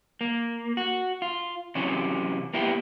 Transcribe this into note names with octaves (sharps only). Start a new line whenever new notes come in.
A#3
F#4
F4
C3 E3 F#3 C#4
A#3 B3 E4 G4